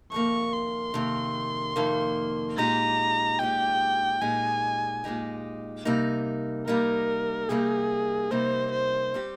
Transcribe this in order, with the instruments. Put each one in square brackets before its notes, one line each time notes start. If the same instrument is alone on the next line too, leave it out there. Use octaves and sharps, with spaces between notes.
[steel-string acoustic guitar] F2 C3 D#3 A#3 [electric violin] C#6
[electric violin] C6
[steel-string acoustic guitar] F2 C3 D#3 A#3
F2 C3 D#3 A#3
[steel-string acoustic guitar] A#2 G#3 D#4 G4 [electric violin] A#5
[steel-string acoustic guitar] A#2 G#3 D#4 G4 [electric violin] G5
[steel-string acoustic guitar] A#2 G#3 D#4 G4 [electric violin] G#5
[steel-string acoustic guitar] A#2 G#3 D#4 G4
C3 G3 A#3 D#4
[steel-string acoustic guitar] C3 G3 A#3 D#4 [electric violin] A#4
[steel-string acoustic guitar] C3 G3 A#3 D#4 [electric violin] G#4
[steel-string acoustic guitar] C3 G3 A#3 D#4 [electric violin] C5
[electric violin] C5
[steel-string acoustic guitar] G3 C4 G4